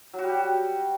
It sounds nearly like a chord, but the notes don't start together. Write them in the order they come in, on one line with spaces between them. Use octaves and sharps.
F#3 F#4 G3 G4